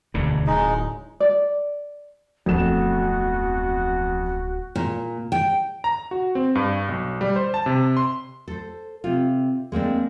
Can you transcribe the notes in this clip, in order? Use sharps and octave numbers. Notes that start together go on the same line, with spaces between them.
E1 D2 C#3
D1 G#3 D#4
D5
D1 F2 B3 F#4 A4 E7
A#2
G5
A#5
F#4
C4
G2
B1
G3
C5
A5
C3
C6
A4 C5
C3 F4
G#3 A#3 C4 D4